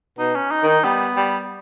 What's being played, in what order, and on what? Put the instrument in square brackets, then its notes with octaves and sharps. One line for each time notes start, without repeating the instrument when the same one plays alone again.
[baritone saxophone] B2 [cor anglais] D#4
[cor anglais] C#4
D#4
[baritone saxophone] D#3
[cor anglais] D#4
[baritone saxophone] G3 [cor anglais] B3
[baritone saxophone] G3